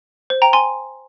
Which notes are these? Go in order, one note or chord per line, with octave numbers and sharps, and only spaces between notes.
C5
G5 A#5
G#5 C6